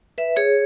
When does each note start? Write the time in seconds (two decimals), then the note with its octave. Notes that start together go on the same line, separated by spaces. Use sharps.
0.18 B4 E5
0.36 G#4 C#5